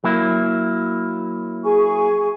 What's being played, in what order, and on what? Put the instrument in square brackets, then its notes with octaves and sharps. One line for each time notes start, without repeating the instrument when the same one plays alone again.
[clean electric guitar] F#3 A#3 E4
[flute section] G#4 G#5 C#6